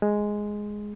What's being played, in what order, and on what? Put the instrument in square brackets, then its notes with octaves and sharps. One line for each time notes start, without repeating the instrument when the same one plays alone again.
[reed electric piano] G#3